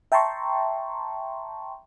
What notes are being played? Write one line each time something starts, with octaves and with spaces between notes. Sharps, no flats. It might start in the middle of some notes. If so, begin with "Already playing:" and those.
E5 G5 A5 A#5 C6 C#6